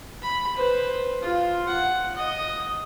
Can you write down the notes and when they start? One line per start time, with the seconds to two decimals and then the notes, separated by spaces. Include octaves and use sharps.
0.23 B5
0.56 B4 C5
1.21 F4
1.67 F#5
2.16 D#5